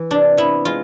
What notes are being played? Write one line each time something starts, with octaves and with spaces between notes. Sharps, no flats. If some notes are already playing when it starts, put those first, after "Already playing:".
Already playing: E3
C3 D4
B3 E4
G#3 F4